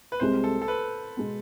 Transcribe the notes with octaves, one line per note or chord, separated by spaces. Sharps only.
B4
C2 C3 G#3 C5
A4
A4
B4
B2 G#3 B3